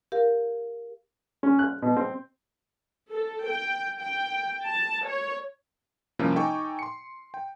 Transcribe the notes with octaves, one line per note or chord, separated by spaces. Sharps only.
G4 A#4 F5
C#4
F#6
B2
C4
A4
G5
G5
A5
C#5
G2 C3 F3 A#3 C#4 E4
D#4 A4 G5 G#5 C#6 D6
C6 C#7
G5